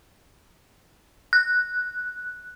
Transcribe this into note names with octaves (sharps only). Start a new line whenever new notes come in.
F#6